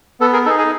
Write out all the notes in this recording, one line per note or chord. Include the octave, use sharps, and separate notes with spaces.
B3 A4
G#4 A#4
D#4 G#4 A4
G#4